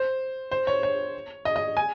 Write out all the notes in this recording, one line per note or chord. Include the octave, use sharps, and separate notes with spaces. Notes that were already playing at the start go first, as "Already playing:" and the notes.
Already playing: C5
C5
C#5
C#5
D#5
D#5
G#5